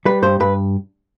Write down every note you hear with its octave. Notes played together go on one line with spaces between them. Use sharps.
G3 B4
G2 C5
G2 B4